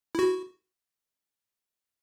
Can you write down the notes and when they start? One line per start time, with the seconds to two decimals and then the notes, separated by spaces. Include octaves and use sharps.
0.15 E4 F#4